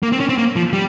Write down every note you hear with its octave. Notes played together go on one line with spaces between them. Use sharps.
A#3
C4
C#4
C4
A#3
F3
G3